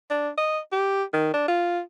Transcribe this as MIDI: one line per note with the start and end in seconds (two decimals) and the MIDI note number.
0.10 0.29 62
0.38 0.59 75
0.72 1.03 67
1.13 1.32 51
1.34 1.46 62
1.48 1.80 65